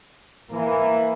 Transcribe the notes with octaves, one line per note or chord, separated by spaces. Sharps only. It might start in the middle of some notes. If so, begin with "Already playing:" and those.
E3 A#3